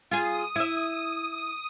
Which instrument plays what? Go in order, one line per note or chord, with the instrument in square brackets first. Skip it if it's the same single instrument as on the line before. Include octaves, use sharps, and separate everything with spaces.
[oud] F4 G#4 [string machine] D#6
[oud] E4 E5